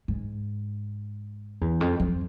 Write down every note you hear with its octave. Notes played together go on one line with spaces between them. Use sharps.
G#2
E2
F2
F2